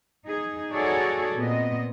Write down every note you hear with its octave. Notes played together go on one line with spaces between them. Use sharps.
D#4 G#4
D#4 F#4 G#4 A4 C#5 D5
A#2 B3 C4 D#5